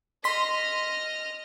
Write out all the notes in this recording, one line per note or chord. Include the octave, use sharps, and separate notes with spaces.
D#5 C6 F6 B6